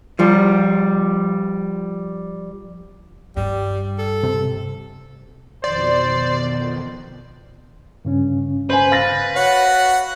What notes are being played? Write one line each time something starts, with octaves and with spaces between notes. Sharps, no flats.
F3 G3
G2 G3
A4
C3
F2 B2 D#3 C5 D5
G2 C#3 C#4
B4 C5 G#5
F5 A6 A#6
F#4 C#5 F#5